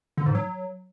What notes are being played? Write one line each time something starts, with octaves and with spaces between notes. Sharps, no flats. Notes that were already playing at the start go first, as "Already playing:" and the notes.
D3
G#2
F#3